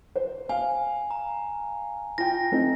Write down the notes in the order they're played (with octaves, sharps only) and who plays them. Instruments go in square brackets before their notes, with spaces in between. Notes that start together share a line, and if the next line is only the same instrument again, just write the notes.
[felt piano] C5
[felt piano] F5 [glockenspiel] G#5
[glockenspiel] A#5
[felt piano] F4 G5 [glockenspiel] A#6
[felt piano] A3 C4 D#4